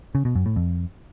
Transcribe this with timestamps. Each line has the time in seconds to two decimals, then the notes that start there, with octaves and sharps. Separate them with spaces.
0.15 C#3
0.25 B2
0.35 F#2
0.46 A2
0.56 F2